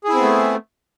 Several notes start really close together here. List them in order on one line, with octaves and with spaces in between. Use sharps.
G#4 E4 C4 B3 A3